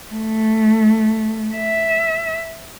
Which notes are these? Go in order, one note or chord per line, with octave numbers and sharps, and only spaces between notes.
A3
E5